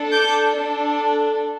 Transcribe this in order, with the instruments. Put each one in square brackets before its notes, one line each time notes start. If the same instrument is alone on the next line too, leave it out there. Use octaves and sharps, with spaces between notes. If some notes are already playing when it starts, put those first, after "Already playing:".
Already playing: [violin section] D4 A4
D6 G6
D4 A4